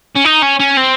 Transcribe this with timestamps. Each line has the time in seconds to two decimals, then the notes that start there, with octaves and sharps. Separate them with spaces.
0.15 C#4
0.24 D#4
0.42 C#4
0.59 C#4
0.77 C4